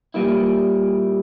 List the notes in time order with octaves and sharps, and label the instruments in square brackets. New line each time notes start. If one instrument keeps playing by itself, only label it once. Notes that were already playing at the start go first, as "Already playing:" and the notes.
[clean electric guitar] A#2 G3 A#3 E4